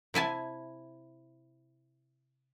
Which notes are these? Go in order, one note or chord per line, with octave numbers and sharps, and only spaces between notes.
C3 E4 G#5 A5